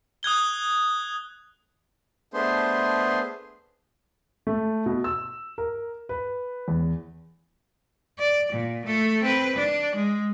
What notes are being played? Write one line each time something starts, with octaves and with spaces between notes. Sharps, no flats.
D#6 F#6 G#6 G7
A3 B3 D4 G#4 C5 C6
A3
B2
E6
A#4
B4
E2
D5
A#2
A3 A4
C4 B4
D4
G#3